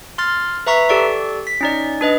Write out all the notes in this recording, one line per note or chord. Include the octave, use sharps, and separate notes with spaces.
C6 F6 A6
B4 E5 A#5 C#6 B6
G4 A4 D5 C#6
B6
C#4 D#4 D5
D4 B4 D#5